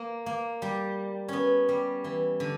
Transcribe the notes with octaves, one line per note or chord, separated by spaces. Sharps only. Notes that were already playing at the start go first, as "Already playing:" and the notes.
Already playing: A#3
A#3
G3
B3 C#4
G3
E3
D3